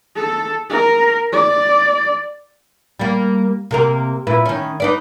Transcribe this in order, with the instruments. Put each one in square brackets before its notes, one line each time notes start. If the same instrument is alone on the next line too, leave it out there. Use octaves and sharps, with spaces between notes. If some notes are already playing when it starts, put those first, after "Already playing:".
[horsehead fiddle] A4
A#4
D5
[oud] G3 A#3
C3 A#3 A#4
A#2 E4 B4
D#3 C#4
D#4 B4 D5